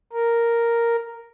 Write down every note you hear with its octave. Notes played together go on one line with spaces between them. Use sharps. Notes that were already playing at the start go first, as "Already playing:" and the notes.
A#4